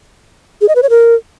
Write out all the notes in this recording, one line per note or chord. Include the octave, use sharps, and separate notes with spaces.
G#4
D#5
B4
C#5
A#4